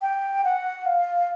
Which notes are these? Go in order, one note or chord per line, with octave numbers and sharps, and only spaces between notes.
G5
F#5
F5